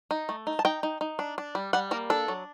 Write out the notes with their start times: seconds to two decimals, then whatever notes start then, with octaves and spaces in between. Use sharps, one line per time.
0.11 D#4
0.29 A3
0.47 D#4
0.59 A5
0.65 D#4 G5
0.83 D#4
1.01 D#4
1.19 D4
1.38 D4
1.55 G3
1.73 G3 F#5
1.91 A#3 A#4
2.10 D4 A4
2.28 F#3